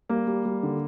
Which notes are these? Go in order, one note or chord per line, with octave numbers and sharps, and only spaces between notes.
G3 A#3
G3
G3
D3